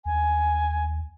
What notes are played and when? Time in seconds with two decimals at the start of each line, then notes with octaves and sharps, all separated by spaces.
0.05 D#2 G#5